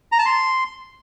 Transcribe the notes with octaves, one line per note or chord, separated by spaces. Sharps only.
A#5
A5
C6